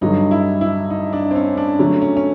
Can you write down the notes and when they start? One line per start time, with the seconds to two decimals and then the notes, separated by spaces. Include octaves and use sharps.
0.01 G2 D3 F#3 D#4
0.31 E4
0.61 E4
0.90 D#4
1.13 D4
1.31 C4
1.35 C#4
1.57 D4
1.79 D3 F#3 A3 C#4
2.02 C#4
2.16 C#4